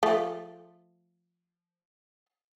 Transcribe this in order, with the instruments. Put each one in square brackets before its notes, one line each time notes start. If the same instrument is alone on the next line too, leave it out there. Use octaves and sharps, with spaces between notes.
[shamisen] F3 A3